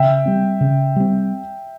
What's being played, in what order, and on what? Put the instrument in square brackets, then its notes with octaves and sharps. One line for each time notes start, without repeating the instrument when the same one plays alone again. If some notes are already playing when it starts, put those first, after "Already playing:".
Already playing: [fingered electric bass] C#3 [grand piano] E5 G5
[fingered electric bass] G3 C4
C#3
G3 C4